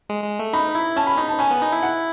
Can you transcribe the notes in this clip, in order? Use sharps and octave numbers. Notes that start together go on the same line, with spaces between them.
G#3
G#3
A3
D#4 B5
E4
C#4 A5
B5
D#4 B5
A5
C#4 G#5
B3
D#4
E4
F#5